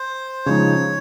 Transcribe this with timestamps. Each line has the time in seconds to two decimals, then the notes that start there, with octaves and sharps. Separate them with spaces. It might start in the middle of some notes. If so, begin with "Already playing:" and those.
Already playing: C5
0.46 C#3 F3 G#3 D#4 C#5